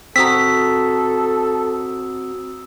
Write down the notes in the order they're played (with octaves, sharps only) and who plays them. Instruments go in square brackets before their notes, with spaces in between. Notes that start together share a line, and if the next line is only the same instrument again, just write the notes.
[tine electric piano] C4 F#4 [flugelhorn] A4 [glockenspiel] A#5 D#6 E6 [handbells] B6